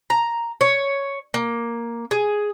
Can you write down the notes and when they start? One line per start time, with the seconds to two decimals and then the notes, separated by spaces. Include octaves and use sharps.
0.10 A#5
0.61 C#5
1.34 A#3
2.11 G#4